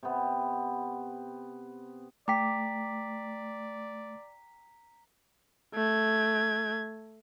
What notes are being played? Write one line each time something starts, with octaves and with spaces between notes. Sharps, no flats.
C3 B3
A3 D5 G5 A#5 D6 B6
A3 G#6